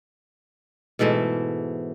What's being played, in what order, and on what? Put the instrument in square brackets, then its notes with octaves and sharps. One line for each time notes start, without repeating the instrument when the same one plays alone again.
[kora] G#2 B2 E3 A3